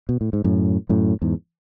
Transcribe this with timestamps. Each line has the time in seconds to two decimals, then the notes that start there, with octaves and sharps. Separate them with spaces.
0.09 B2
0.21 A2
0.33 G#2
0.44 F#2 A2
0.89 F#2 A2
1.22 E2 G#2